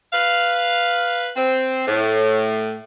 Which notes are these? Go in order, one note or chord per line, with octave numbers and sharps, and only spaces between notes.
B4 F5
C4
A2